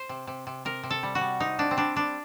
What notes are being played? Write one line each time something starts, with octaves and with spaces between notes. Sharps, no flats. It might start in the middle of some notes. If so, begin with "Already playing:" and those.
Already playing: C5
C3
C3
C3
C3 A#4
C3
A4
G3
F#4
G3
C3 D#4
C3 D4
C4
G3 D4
G3 D4